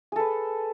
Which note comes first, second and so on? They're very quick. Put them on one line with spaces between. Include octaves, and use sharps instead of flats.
G#4 A4 B4